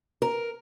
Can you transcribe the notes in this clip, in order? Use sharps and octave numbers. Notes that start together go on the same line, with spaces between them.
A#4